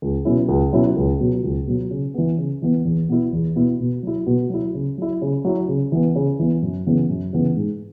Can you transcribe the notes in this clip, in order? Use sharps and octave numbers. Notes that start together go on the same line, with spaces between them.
C#2
B2 F#3 C#4 E4
C#2
B2 F#3 C#4 E4
C#2
B2 F#3
C#2
B2 F#3
C#3
E3 B3
C#3
E3 B3
E2
B2 B3 E4
E2
B2 B3 E4
B2
F#3 E4
B2
F#3 E4
C#3
F#3 E4
C#3
F#3 E4
C#3
E3 B3
C#3
E3 B3
F#2
C#3 E3 B3
F#2
C#3 E3 B3
G#2